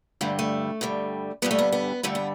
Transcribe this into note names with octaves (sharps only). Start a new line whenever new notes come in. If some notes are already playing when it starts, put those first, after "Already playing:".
G2 D3 G3 A3
A3
G2 D3 G3
G2 D3 G3 B3
A3
B3
B3
G2 D3 G3 A3
B3